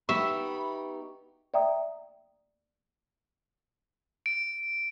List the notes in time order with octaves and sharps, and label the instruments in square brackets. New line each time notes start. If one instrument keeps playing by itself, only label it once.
[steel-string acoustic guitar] B3 D#4 G4 [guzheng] E5 [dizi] B5 [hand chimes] C#6
[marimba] D5 E5 G5 A#5 D#6
[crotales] D7